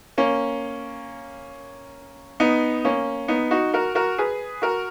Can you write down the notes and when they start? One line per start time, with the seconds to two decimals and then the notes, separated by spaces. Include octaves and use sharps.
0.18 A#3 C#4
2.40 B3 D#4
2.85 A#3 C#4
3.28 B3 D#4
3.51 D#4 F#4
3.73 F#4 A#4
3.95 F#4 A#4
4.18 G#4 B4
4.62 F#4 A#4